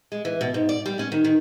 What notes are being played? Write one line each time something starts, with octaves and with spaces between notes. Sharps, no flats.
G#3
E3
B2
G#2
D5
G3
C#4
D#3
D#3